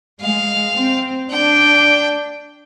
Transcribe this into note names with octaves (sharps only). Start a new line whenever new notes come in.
G#3 F5
C4
D4 G5